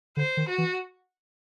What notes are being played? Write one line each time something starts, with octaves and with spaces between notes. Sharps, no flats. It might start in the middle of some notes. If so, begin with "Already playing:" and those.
D3 C5
D#3
F#4
E3